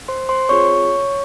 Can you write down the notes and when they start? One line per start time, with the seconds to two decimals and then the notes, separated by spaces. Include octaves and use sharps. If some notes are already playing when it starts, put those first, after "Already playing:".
0.08 C5 C6
0.29 C5 C6
0.49 C4 F4 G#4 C#5 C#6